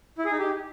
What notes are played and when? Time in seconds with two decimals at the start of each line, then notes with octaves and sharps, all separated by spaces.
0.18 E4
0.25 G#4
0.32 D#4
0.39 G4